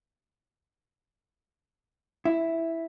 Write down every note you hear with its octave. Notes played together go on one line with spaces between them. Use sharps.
E4